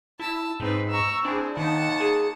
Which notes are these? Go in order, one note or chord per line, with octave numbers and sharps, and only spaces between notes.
E4 A5 E6
G#2 C4 D#4 B4
A#5 C#6 E6
C4 D4 E4 G#4
D#2 D#3 F#5 A5
G#4